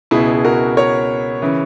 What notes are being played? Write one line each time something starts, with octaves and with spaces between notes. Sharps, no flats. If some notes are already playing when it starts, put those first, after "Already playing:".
C#2 B2 E4 G#4
G#4
F#4 A#4
A#4 C#5
C#3 E3